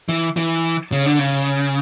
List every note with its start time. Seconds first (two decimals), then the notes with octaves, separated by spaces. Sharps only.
0.09 E3
0.37 E3
0.92 C#3
1.06 D3
1.19 C#3